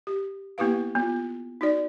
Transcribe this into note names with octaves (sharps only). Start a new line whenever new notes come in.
G4
A#3 B3 E4 G4 B4 F5
B3 F4
D#4 F#4 D5